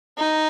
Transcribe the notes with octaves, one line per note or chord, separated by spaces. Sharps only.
D#4